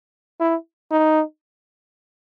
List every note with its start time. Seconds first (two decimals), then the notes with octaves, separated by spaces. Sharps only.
0.40 E4
0.91 D#4